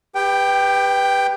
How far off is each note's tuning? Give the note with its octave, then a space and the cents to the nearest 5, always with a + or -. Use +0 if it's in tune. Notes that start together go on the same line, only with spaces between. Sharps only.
G4 +30 B4 +0 G5 +0